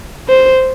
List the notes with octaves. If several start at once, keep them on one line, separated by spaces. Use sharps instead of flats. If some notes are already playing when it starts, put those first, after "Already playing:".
C5